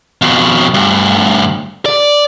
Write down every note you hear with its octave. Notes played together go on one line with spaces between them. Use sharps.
F2 B2
D2 G2
D5